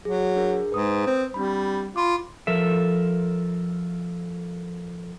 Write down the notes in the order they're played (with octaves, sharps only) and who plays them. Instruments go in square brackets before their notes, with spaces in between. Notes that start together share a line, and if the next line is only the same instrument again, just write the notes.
[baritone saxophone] F#3 [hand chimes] G#4
[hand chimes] D4 G#4 A#4
[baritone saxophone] G#2 [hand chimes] B4 D#6
[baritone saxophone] C4
[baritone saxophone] G3 [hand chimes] C4 D4 B5
[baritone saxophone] F4 [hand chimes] B5 C6 D6
[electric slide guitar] F3 A4 A#4 E5